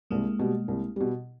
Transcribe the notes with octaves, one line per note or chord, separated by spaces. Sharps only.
C2 G#3 A#3
B2 G3
C2
B2 G3